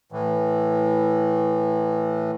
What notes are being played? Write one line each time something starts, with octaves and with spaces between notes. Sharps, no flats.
A2 E3